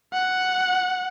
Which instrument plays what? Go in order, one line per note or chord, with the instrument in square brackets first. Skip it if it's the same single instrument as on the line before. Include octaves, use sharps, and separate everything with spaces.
[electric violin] F#5